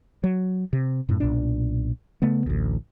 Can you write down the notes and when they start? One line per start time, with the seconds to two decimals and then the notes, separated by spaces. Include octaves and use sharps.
0.24 F#3
0.73 C3
1.09 F#2 A2
1.20 B1 A#2 D4
2.22 C#3 A3 B3
2.46 A1 D2